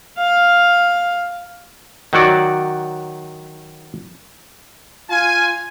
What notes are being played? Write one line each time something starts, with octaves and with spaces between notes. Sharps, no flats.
F5
D#3 F#3 F#4 D5
F4 G#5